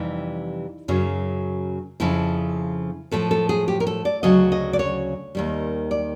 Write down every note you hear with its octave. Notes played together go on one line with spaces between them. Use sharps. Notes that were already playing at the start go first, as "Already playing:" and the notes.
Already playing: F2 C3 E3 G3 D#4
F#2 C#3 F#3
F2 C#3 F3 E4
A2 F3 A4
A4
G#4
G4
A#4
A4
D5
D2 C#3 F#3 D#5
D#5
D5
C#5
D#2 D#3 G3
D5